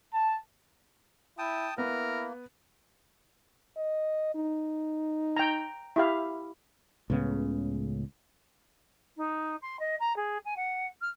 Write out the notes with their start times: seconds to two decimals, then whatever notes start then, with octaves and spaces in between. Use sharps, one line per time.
0.14 A5
1.38 E4 G5 A5 D#6
1.78 A#3 B3 E4 A#4
3.77 D#5
4.35 D#4
5.36 G5 A#5
5.96 E4 G4 F5
7.10 C#2 A2 C#3 B3
9.16 D#4
9.61 C6
9.79 D#5
9.99 A#5
10.16 G#4
10.45 G#5
10.56 F#5
11.01 F6